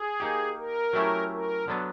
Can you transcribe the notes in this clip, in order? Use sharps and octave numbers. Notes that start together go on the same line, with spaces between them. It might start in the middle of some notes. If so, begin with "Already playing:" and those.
Already playing: G#4
A#3 D#4 G4
A#4
F#3 A3 C#4 E4 G4
A#4
D3 F#3 B3 D4